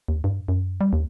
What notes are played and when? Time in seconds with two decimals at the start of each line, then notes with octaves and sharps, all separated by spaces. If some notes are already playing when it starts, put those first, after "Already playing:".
0.08 D#2
0.24 G2
0.48 F#2
0.81 G3
0.93 D#2